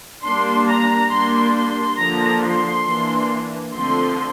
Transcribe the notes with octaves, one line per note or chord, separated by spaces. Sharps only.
G3 A#3 D4 C6
A#5
G3 A#3 D4 C6
C6
D3 F3 A#3 D4 A#5
C6
E3 A#3 D4
D3 F3 A3 C4 C6